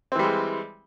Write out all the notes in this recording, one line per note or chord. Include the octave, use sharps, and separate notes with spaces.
E3 G3 G#3 C4